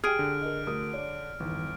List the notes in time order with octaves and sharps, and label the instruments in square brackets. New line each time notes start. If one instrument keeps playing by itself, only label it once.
[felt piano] G4 G5 [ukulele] G#4 [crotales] F6 D7
[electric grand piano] D3
[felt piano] A#4 D#5
D2 A#4 D#6
C#5 D5
[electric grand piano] G1 [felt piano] E2 D#3